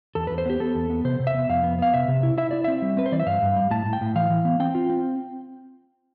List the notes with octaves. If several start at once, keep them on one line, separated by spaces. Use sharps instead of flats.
E2 A4
E2 B4
C5
B3 G4
B3 A4
E2
B3
C3 C5
C3
E5
B3
F2 F5
B3
B3 F5
C3 E5
C3
E4
E4 E5
E4 D5
C4 E5
G3
C4 B4
C5
E3 D5
E5
G2 F5
G2
G3
A2 A5
A2
G5
A2
E3 F5
E3
B3
C4 G5
F4
C4